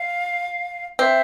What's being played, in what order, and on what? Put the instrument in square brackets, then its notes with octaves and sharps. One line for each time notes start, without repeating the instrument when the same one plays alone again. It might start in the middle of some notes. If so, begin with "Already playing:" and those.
Already playing: [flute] F5
[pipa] C4 [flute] E5